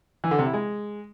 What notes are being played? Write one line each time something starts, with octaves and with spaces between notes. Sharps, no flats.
E3
D3
C3
E4
G#3